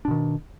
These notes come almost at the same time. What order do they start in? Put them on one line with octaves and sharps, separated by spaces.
D4 B2 D#3